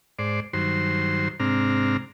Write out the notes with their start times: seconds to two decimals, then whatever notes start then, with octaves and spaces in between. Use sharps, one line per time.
0.19 G#2 C5 D5
0.53 G2 D#3 F#3 C5 C6
1.40 G#2 C3 C4 D4 A#5 F6